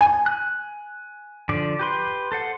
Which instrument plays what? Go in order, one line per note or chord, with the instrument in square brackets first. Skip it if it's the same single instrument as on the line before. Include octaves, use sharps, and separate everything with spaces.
[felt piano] G#5
[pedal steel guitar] F#6
D3 F3 D5
G4 B4 C6
A4 C5 F#5